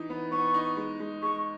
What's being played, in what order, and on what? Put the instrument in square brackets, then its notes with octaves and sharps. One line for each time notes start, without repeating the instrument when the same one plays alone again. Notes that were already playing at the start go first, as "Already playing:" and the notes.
Already playing: [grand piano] E3 D#4
B3
[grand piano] B3 [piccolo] C#6
[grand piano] D#4
G#3
G#3
[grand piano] G#3 [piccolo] C#6